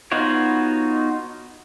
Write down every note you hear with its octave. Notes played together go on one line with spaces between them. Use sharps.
B3 D#4 F4 F#4 C#5